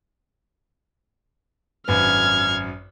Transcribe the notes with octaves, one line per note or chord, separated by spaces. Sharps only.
G#1 F#2 B4 F6 G#6